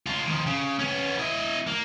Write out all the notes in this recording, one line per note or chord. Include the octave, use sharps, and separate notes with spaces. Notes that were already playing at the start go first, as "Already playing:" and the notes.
G#3 F4
D#3 F3
C#3
B3 C#4
E4 D#5
A#3